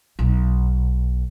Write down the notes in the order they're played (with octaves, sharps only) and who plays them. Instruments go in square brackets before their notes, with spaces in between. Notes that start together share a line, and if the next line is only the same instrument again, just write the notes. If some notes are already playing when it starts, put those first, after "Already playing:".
[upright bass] B1